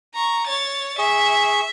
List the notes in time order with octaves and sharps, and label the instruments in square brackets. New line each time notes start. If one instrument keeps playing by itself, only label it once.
[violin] A#5 C#6
C#5 A6
[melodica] G#4 C#6 [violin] E5